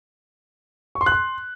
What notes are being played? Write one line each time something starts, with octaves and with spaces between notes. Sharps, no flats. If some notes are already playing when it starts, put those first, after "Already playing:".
C#6
C6
F#6
C6